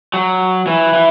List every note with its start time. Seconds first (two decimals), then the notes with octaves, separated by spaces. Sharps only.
0.14 F#3
0.67 E3
0.94 E3